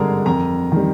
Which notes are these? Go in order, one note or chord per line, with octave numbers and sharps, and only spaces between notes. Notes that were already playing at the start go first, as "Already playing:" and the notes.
Already playing: G#1 G2 D3 G#3 G#4 A#4 A#5
F2 A#4 A#5
D#3 G3